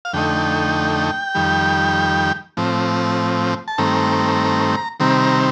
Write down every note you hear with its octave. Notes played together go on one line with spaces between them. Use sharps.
F5
F2 D3 A3 D#4 G5
F2 D#3 G3
A2 F3 C4
A5
G2 D#3 A3 C4 A#5
C3 D#3 G3 C4 A#5
A#5